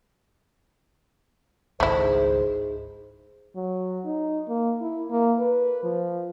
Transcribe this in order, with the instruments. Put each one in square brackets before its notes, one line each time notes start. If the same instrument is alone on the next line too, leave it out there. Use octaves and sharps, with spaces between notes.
[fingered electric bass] G#1 C#2 [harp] G#2 [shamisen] A3 E4 [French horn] C5
[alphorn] F#3
D#4
A#3
E4
A#3
B4
F3